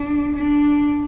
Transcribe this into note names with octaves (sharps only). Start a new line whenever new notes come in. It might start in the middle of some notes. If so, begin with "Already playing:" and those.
Already playing: D4
D4